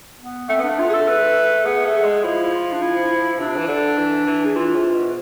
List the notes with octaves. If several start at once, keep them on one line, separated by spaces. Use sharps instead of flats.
B3
A3 C4
B3 D4
A3
F4
G#4
A4
B4
B3 G#4
A3
G#4
G#3
F3 E4
E4
F4
D4
E4
C3 D4
E3
D3
E3
E3
G#4
E3 F4
C3
B2